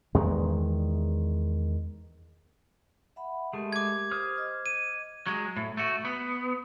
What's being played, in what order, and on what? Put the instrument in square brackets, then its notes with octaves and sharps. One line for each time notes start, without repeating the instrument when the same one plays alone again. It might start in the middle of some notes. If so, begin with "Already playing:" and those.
[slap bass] E2 D#3 G#3
[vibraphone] E5 F#5 B5
[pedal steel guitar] G#3 A3 [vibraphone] G4 A#4
[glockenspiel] D6 G#6
[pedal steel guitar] C5 D#6 F6
[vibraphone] D#5
[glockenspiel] D#7
[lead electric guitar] F#3 G#3
A2
A3 F#4
B3